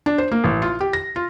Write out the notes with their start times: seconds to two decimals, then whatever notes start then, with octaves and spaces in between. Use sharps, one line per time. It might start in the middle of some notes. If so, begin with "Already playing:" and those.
0.06 D4
0.18 C5
0.32 A#3
0.44 A1
0.62 F4
0.81 G4
0.93 A#6
1.16 F4